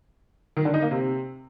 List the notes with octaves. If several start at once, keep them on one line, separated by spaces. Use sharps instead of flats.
D#3
D3
D#4
A#3
C3